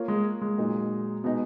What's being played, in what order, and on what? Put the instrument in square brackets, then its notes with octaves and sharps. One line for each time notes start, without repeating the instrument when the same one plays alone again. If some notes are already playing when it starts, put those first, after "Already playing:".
Already playing: [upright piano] A#3 F4 A#4 C#5
[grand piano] G#3
G#3
[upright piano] A#2 F#3 A#3 D#4
[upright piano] B2 G#3 D#4 [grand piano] B3